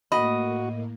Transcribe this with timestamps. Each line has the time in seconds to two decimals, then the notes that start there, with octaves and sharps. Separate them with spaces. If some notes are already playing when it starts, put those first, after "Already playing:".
0.12 A2 A#3 F#4 D#5 B5